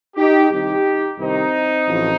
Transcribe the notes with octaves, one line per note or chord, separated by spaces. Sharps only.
D#4 G4
C2 C3 D#3 D#4 G4
C2 C3 D#3 C4 D#4
A1 A2 F3